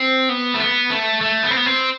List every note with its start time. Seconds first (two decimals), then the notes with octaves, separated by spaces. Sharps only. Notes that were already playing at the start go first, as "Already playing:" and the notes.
Already playing: C4
0.29 B3
0.54 A3
0.59 B3
0.90 A3
1.21 A3
1.43 B3
1.50 C4
1.57 B3
1.66 C4